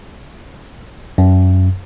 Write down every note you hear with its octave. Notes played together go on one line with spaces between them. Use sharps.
F#2